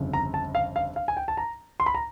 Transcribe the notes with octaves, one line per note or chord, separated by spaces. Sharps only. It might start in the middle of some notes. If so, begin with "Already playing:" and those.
Already playing: G1 F2 C#3
A#5
A5
F5
F5
F5
G#5
G5
A5
A#5
C6
B5
A#5